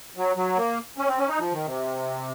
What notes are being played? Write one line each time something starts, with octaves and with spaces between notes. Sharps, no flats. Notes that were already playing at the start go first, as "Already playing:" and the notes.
F#3
F#3
A#3
C#4
C4
C#4
D#4
F3
D#3
C3